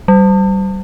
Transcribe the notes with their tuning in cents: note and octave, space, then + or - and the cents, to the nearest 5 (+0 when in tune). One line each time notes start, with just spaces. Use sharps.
G3 -25